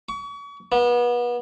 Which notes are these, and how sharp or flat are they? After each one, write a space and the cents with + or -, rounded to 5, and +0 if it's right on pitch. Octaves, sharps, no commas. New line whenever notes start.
C#6 +35
B3 -30